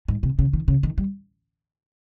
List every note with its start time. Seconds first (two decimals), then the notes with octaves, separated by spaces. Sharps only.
0.08 G#2
0.23 C3
0.39 C#3
0.53 D#3
0.68 C#3
0.83 D#3
0.98 G3